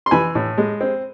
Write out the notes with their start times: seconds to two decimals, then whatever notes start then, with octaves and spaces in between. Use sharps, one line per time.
0.06 C6
0.11 E3 G#5 B5
0.35 A2
0.58 G#3
0.81 C4